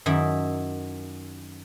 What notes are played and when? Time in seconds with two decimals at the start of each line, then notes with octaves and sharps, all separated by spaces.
0.06 F#2 D#3 E4 E5